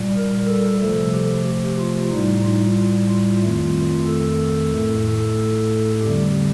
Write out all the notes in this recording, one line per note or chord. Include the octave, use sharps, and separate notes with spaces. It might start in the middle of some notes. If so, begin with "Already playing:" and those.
Already playing: A#2 G3
A#4
A4
C3 F3 A3 A4
G4
G4
F4
A2 G3 D#4
F4
F4
F2 D#3 A3
A4
A2 A3
A4
F2 D3 G3 G4